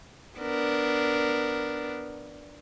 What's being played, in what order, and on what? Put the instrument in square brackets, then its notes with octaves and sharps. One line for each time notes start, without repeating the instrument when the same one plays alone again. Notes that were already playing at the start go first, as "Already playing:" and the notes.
[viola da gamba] B3 D4 A#4